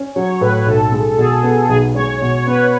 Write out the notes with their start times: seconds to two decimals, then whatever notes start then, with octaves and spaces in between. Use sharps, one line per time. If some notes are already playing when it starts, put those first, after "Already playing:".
Already playing: C#4
0.15 F#3 C#5
0.41 A2 B4
0.66 B1 A4
0.92 G#3
1.13 A4
1.18 B2 G#4
1.43 B3
1.69 B1 G#4
1.95 G#3 C#5
2.21 B2 C#5
2.47 B3 B4